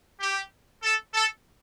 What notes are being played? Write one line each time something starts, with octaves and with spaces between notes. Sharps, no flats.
G4
A4
A4